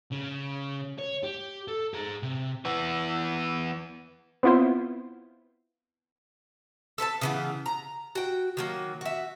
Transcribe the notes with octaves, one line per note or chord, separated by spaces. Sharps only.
C#3
C#5
G4
A4
G#4 A#5
C3
E3 B3
B3 C4 E4 F4 C5
A4 B4 E5 A5
C#3 E3 B3
A#5
F#4 G5
D#3 F#3 A#3
F#4 E5